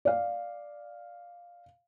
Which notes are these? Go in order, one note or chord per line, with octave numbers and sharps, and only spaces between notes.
D5 F5